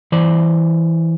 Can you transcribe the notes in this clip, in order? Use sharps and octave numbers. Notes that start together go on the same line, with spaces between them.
E3 C5 D5